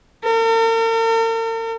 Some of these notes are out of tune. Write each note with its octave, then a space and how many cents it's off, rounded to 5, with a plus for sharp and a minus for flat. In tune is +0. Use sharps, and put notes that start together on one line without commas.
A#4 -45